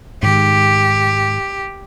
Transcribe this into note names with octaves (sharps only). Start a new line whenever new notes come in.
G#2 D#3 G4